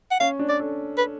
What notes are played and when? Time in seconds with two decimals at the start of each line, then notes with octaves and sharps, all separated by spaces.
0.11 F#5
0.20 C#4 F5
0.39 D4
0.49 D5
0.60 A4
0.98 B4